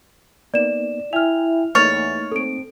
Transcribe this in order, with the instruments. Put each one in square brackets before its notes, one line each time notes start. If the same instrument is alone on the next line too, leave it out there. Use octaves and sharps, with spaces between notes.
[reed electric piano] A#3 B3 D#4 [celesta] D5 E7
[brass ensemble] E4 [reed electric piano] E5 G5 G#5 [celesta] F6 F7
[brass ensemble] E2 [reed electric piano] A3 A#3 D#4 [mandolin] C#5 [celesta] F6 A6
[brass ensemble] C4 [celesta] A4 D7